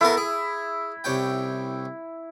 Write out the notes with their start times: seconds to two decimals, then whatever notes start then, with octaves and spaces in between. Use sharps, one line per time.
0.01 A3 B3 E4 A#4
0.17 G#4
1.04 C2 C#4 G5